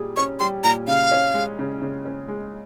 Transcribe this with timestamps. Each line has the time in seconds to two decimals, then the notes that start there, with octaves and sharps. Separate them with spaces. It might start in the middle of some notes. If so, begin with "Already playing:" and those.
Already playing: A#2 G3 G#4
0.17 C#4 C#6
0.40 G3 C6
0.64 A#2 A#5
0.87 C#3 F5
1.12 C#4
1.34 G#3
1.59 C#3
1.82 C#3
2.05 C#4
2.28 G#3